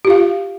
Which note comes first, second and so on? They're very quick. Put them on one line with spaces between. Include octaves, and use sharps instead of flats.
G4 F4 F5